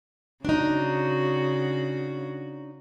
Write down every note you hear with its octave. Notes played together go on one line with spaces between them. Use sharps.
C#3 D4 D#4 F#4